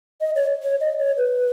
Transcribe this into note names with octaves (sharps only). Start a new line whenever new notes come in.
D#5
C#5
C#5
D#5
C#5
B4